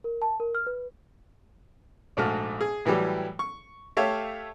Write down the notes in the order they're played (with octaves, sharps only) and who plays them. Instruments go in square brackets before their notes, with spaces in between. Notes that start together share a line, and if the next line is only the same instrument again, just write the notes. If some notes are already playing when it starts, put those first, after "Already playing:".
[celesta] A#4
A5
A#4
F6
B4
[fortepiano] A#1 G#2 A3 F#4 F6
G#4
A2 E3 F#3 G3 G4
C#6
A3 G4 C#5 E5 F5